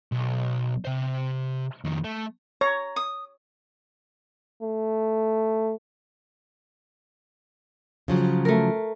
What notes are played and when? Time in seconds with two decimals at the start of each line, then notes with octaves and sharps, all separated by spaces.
0.12 B1
0.85 C3 C5
1.84 F2 D#3
2.04 A3
2.61 C#5 A#5
2.96 D#6
4.62 A3
8.08 C#3 F3 F#3
8.45 A3 A#4